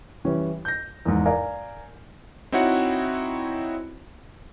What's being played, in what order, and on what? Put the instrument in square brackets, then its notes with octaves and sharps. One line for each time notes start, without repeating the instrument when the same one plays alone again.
[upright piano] E3 G3 C#4
G6 A#6
E2 G#2
A#4 D5 F5 G#5 A#5
[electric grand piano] C4 D#4 E4 F#4 C#5 F#5